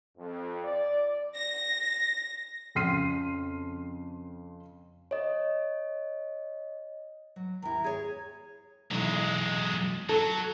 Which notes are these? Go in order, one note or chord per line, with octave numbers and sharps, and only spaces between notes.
F2
D5
A#6
F2 C#3 C6 F6 C7 D#7
C#5 D#5
F#3
D#2 E4 A#5
G#4 C#5 G#6
B1 E2 F#3 G#3
F#3 A4